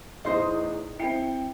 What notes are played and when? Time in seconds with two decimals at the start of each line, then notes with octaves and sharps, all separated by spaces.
0.25 E2 A2 D#4 C5 D#5
0.99 C4 E4 G5 C7 C#7